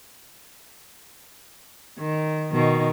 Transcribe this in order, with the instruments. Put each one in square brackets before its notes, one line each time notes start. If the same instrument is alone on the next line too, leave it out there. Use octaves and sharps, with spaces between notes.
[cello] D#3
B2 D#3